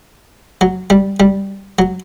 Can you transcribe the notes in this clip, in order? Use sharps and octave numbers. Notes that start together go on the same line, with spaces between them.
F#3
G3
G3
F#3